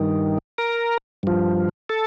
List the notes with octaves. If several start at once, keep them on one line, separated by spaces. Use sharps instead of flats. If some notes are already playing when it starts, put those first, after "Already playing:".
Already playing: G2 D#3
A#4
G2 F3
A4